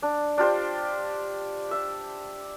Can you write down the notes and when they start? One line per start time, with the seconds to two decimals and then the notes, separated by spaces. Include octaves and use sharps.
0.02 D4
0.38 D4 F4 G4 C5
1.71 E5